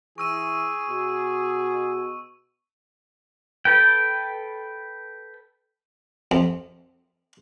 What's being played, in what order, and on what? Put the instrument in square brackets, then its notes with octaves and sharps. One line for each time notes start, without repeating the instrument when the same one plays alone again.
[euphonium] E3 [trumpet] G#4 [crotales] C#6 E6 D#7
[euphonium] B2
[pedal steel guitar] A4 B4 G5
[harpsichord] F2